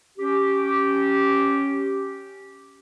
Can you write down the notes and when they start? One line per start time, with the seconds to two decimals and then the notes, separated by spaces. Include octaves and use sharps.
0.18 C#4 G4